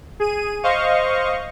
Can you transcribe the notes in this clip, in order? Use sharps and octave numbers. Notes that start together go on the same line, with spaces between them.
G#4 D#7
C5 D#5 F5 C#6